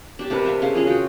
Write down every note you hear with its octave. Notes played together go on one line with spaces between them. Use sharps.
D4 G4 A5
C3 D4 A#4 B4
C5 E5 F5
C#3 F5
C#4 F4 G#4
F#4 G5